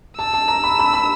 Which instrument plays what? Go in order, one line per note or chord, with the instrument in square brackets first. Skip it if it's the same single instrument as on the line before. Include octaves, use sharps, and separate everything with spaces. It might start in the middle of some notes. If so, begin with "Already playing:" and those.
[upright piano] A5 [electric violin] E6
[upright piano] A5
A#5
B5
B5
B5